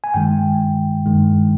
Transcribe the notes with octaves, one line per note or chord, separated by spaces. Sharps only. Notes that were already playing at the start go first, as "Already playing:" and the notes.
G#5
G2 D#3 G#3 G5
G2 D#3 G#3